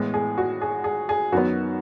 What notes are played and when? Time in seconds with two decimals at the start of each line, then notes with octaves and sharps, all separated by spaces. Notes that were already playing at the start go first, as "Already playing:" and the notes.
Already playing: A2 E3 G#3 B3
0.14 G#4
0.38 F#4
0.61 G#4
0.84 G#4
1.09 G#4
1.32 F#2 D#3 F#3 B3 F#4